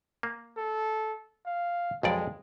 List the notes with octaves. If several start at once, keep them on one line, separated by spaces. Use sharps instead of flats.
A#3
A4
F5
B1 F2 G#3 D5